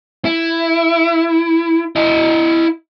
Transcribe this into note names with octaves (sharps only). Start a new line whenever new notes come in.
E4
E4 D#5